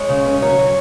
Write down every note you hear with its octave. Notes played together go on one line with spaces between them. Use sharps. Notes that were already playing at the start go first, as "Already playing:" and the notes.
Already playing: G#3 C#5
C#3
C#4
F#3 C#5
F#3